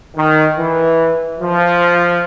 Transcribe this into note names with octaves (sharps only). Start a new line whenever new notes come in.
D#3
E3
F3